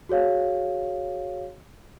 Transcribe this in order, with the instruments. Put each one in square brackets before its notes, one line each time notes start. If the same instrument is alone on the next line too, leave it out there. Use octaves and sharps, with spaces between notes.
[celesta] F#4 G#4 C#5 F5